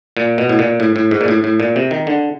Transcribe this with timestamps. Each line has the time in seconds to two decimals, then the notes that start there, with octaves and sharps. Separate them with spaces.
0.17 A#2
0.38 B2
0.49 A2
0.59 A#2
0.80 A2
0.96 A2
1.11 G#2
1.21 A#2
1.28 A2
1.44 A2
1.60 A#2
1.76 C3
1.91 D#3
2.07 D3